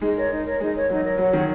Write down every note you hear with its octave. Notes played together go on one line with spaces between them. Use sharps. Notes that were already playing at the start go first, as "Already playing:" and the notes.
G#3 D#4
A#4 C#5
D#4
A#4 C#5
G#3 D#4
A#4 C#5
F#3 D#4
A#4 C#5
F#3 F#4
D#3 C#5 F#5